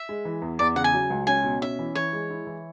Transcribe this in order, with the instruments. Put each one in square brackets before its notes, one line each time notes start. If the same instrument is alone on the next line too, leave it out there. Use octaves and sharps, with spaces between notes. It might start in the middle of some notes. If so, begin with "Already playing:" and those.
Already playing: [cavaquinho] E5
[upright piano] G#3
E3
E2
[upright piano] E2 [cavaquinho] D5
[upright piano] C#3 [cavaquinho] F#5
[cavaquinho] G#5
[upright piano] F#3
C#2
[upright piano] C#4 [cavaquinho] G#5
[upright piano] B2
[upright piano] C#4 [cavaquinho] E5
[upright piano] E3
[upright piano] E3 [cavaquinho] C#5
[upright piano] G#3
E4
E3